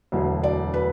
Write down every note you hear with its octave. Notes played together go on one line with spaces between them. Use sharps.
E1 D2 D3 F#3
D5
B4